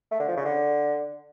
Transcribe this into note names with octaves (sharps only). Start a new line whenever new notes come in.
A3
D3
F3
C#3
D3